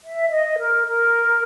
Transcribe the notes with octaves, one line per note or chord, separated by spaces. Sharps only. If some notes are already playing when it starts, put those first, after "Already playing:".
E5
D#5
A#4
A#4